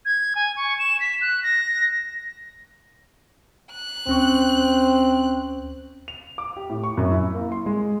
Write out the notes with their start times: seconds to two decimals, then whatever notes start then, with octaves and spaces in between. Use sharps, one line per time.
0.05 G#6
0.35 G#5
0.56 C#6
0.79 E7
1.00 B6
1.21 F#6
1.43 A#6
3.72 F#6
4.07 D2 C4 C#4 C#6
6.08 F7
6.38 D6
6.56 G4
6.69 A2
6.84 C#6
6.97 F#2
7.10 E4
7.35 A#3
7.52 C6
7.66 G#3